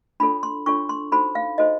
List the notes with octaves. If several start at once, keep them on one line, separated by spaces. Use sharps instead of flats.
D4 F4 A4 C#5 B5
C6
D4 F4 A4 C#5 C#6
C6
D#4 F#4 A4 C5 B5
F5
D#4 F#4 A4 C5 D#5